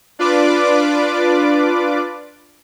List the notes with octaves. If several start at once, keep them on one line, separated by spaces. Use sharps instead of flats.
D4 F4 B4 D5 D6